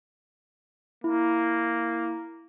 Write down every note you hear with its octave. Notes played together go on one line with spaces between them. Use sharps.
A#3 E4